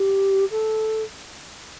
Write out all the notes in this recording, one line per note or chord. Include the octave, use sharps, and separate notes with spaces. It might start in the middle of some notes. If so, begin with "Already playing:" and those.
Already playing: G4
A4